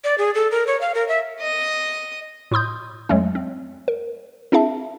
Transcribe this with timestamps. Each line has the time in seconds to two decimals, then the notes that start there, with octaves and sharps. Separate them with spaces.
0.04 D5
0.18 G#4
0.35 A4
0.51 A#4
0.67 C#5
0.81 F5
0.95 A#4
1.09 E5
1.39 D#5 D#6
2.51 A2 E4 C6 D#6 G6
3.09 F2 F#3 G#3 A3 C#4
3.35 C4
3.88 A#4
4.52 C4 D4 E4 G#4 E5 A5